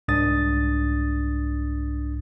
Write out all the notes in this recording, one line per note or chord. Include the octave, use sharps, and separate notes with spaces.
C2 G#2 D4 D#6 A6